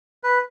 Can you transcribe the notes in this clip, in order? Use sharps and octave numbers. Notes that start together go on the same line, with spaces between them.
B4